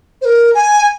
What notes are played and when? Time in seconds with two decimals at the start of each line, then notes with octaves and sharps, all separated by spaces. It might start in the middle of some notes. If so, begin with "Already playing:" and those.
0.21 C5
0.25 A#4
0.55 G#5